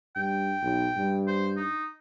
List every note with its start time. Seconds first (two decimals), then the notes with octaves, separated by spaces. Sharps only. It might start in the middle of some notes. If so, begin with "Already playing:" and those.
0.16 G2 G5
0.62 B1
0.97 G2
1.28 C5
1.57 D#4